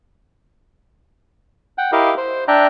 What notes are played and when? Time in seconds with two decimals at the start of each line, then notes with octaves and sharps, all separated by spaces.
1.78 F#5 G5
1.92 E4 G4 A#4 D#5 F5
2.18 C5
2.48 D4 D5 E5 G5 A#5 F#6